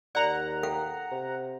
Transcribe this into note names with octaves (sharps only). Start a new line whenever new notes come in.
D#2 D5 F#5 A#5
A4 F5 G5
C3